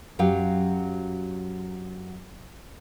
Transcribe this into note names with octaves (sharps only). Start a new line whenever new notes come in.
F#2 F#3 G4 F5